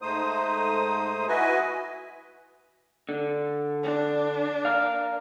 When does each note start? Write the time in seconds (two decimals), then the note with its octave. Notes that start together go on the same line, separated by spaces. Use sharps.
0.02 G#2 A3 D#4 C5 D#6
1.28 E4 F#4 B4 D#5 G#5
3.09 D3
3.83 D4
4.65 A#4 F5